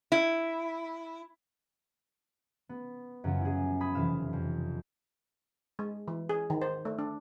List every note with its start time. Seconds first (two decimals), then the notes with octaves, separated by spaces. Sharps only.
0.12 E4
2.69 B3
3.24 F#2 C#3 F3 F#3
3.41 E4 G#4
3.81 B5 D#6 G#6
3.94 F1 C3 E3 F5 E7
4.33 F2
5.79 G#3
6.08 E3
6.29 G#4
6.50 D#3
6.62 C5
6.85 A3
6.99 D4